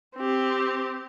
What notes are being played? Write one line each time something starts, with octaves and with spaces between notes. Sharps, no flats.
C4 G4